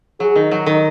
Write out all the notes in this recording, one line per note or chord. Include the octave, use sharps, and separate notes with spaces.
F#3 G#4
D#3
F#3
D#3